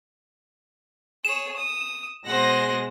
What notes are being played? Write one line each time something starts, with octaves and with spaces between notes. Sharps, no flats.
G#4 C#5 E7
D#6
B2 G#3 C5 F#5 A#6